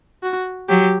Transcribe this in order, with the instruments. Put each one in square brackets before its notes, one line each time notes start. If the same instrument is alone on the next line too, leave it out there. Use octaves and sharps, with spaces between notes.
[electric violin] F#4
[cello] F#3 [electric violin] G4